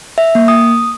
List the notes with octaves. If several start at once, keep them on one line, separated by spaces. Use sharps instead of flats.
E5
A#3
D#6